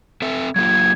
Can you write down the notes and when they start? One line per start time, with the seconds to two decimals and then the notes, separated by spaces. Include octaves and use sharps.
0.22 C4 A4 E5
0.56 F#3 A#3 F4 G#6